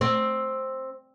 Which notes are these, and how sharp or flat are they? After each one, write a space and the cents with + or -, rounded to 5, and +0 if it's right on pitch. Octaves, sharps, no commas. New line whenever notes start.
C4 +10